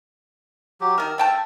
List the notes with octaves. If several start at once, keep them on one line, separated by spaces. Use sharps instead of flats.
F#3 G4
D#3 A#4 E6
A3 G5 A5